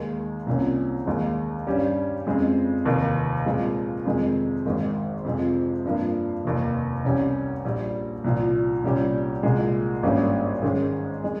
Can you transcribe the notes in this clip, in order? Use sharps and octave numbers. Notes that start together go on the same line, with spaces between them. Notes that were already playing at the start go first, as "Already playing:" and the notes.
Already playing: D#2 D#3 G#3
C2 C3 F3 A#3 C#4
D#2 D#3 G#3
G2 G3 C#4 G4
F2 C#3 G#3 C4
F1 D#2 D#3 A#3
A#2 F3 G#3 C4 F4
F2 C3 D#3 G#3
G#1 G#2 D#3
F2 C3 F3 G#3
G2 F3 A#3
F1 D#2 D#3
C2 C3 G3 C#4 G4
A#1 A#2 G3
C2 A#2 F3
C2 A#2 G3 C#4 G4
C2 A#2 G#3
G#1 G2 G3 A#3 C#4
G#2 D#3 G#3 C#4
G#3 D#4